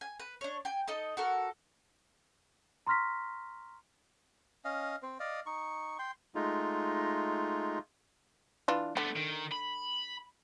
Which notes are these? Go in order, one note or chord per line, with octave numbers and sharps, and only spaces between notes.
G#5
B4
D4 C#5
G5 G#5
D#4 A4 D#5
F#4 A4 A#4
A#5 C6 C#6 F6 A#6 B6
C#4 D#5 F5
C4 C5
D5 D#5 F5
D#4 C#6
G5 C6
G#3 A3 D#4 F4
E3 D4 F4
D3 A3 B3
D#3
B5